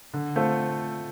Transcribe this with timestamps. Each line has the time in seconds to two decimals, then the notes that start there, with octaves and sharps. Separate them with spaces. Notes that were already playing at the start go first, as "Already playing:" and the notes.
0.14 D3
0.36 A3 C4 F4 A4